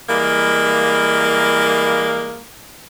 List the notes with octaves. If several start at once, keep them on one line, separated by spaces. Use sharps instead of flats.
E3 G3 G#3 A#3